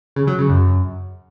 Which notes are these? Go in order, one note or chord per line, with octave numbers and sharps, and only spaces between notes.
C#3
F#3
C#3
F#2